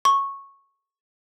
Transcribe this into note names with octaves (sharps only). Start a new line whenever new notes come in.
C#6